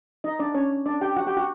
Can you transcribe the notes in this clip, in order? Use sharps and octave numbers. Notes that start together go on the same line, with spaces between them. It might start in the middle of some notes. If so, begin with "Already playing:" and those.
D#4 D#5
D4 D5
C#4 C#5
D4 D5
G4 G5
F#4 F#5
G4 G5
F#4 F#5